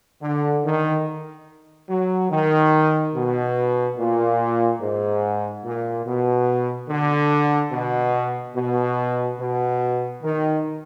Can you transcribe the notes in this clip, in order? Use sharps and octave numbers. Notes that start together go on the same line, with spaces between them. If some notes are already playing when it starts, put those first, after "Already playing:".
D3
D#3
F#3
D#3
B2
A#2
G#2
A#2
B2
D3
B2
B2
B2
D#3